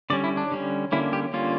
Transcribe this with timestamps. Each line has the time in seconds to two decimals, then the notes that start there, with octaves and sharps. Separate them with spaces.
0.10 D3 G3 C#4 D5
0.24 E4
0.37 D4
0.52 D3 G3 C#4
0.92 D3 G3 A#3 C#4 E4
1.13 G4
1.33 D3 G3 A#3 C#4 F4